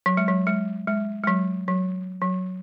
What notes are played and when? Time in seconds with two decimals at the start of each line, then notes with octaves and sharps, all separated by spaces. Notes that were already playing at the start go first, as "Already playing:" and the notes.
0.06 F#3
0.17 G#3
0.28 F#3
0.47 G#3
0.88 G#3
1.24 G#3
1.27 F#3
1.68 F#3
2.21 F#3